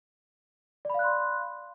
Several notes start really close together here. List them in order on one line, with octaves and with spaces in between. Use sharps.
D5 B5 F5 F#6 C6